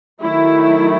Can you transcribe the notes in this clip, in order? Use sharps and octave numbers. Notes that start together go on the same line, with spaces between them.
D#3 F#3 A3 E4